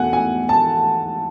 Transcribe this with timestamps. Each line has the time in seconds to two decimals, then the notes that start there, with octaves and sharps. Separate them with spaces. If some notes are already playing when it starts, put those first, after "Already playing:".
Already playing: E2 B2 A3 F#5 G#5
0.13 G#5
0.49 A5